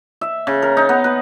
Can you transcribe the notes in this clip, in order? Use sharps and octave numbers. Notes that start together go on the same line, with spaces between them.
E5
C#3
A#4
D#4
B3
B4